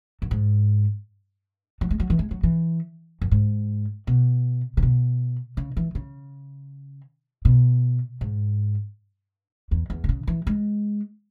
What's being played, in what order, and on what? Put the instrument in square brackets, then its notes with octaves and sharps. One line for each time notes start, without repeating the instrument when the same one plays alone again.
[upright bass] F#2
G#2
F#3
G#3
F#3
E3
G#3
F#3
E3
F#2
G#2
B2
C#3
B2
C#3
E3
C#3
B2
G#2
E2
E2
B2
C#3
E3
G#3